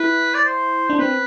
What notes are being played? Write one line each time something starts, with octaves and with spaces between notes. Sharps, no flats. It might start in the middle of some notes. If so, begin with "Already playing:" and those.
Already playing: E4 B4
D5
C5
D4
C4 B4